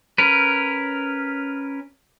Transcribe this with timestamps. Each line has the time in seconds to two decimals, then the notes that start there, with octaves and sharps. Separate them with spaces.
0.18 C#4 A#4 B4